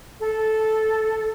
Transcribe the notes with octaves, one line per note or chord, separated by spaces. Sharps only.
A4